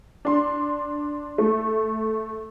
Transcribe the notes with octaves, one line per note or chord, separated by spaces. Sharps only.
D4 C6
A3